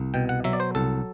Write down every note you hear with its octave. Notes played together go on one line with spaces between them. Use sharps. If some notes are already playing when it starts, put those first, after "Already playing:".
Already playing: C2
B2 G5
F#5
F#3 E5
D5
C5
C2 A4